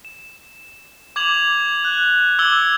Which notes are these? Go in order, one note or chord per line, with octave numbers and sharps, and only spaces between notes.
E7
D6 G#6 F7 F#7
F#6
D6 E6 G#6 F#7 G7